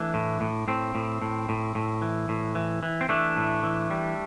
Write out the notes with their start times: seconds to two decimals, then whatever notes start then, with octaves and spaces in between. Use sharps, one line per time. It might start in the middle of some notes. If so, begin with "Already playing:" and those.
Already playing: E3 A3 D4
0.14 A2
0.41 A2
0.68 A2 C4
0.95 A2
1.22 A2
1.49 A2
1.75 A2
2.02 E3
2.29 A2
2.55 E3
2.83 E3
3.01 C4
3.09 E3 A3 D4
3.37 A2
3.63 E3
3.90 G3